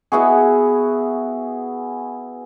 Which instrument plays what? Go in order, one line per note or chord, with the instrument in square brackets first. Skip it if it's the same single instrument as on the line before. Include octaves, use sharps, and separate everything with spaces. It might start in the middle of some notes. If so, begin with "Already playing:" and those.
[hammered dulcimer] B3 E4 F#4 G#4